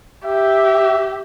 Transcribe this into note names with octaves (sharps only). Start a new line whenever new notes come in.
G4 E5